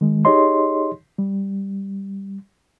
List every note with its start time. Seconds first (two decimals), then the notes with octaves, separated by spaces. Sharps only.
0.01 D#3 G#3
0.25 D#4 G4 G#4 C#5 D#5 C6
1.18 G3